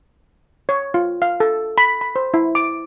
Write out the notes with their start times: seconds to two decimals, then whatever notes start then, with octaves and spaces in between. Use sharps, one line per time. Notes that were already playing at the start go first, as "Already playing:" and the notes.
0.69 C#5
0.94 F4
1.22 F5
1.40 A4
1.78 B5
2.01 B5
2.16 C5
2.34 E4
2.55 D6